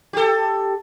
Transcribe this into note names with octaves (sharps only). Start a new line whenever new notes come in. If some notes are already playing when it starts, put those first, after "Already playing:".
G4 A4